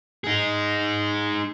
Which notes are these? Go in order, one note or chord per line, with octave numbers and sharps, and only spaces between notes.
D#4 G#4